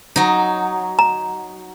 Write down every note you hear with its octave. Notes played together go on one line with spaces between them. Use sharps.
F#3 D#4
A#5